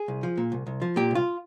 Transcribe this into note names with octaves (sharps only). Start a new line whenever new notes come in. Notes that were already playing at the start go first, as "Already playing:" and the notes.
Already playing: G#4
C2
F3
A#2
C2
C2
F3
A#2 G4
C2 F4